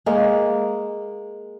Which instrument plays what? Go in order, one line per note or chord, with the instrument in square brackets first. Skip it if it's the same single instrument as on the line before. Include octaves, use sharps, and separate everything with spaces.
[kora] G#3 A#3